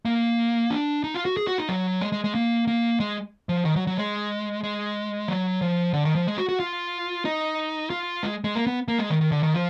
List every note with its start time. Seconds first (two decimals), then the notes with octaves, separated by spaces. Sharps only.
0.05 A#3
0.71 D4
1.04 D#4
1.14 F4
1.25 F#4
1.37 G#4
1.47 F#4
1.58 D#4
1.69 F#3
2.01 G#3
2.12 G#3
2.24 G#3
2.35 A#3
2.67 A#3
3.00 G#3
3.49 F3
3.65 D#3
3.76 F#3
3.87 F#3
3.98 G#3
4.64 G#3
5.28 F#3
5.62 F3
5.93 D3
6.05 D#3
6.15 F3
6.27 G#3
6.38 F#4
6.49 F#4
6.60 F4
7.25 D#4
7.90 F4
8.23 G#3
8.44 G#3
8.55 A#3
8.67 B3
8.88 A#3
8.99 G#3
9.10 D#3
9.21 D#3
9.32 D3
9.43 D#3
9.54 F3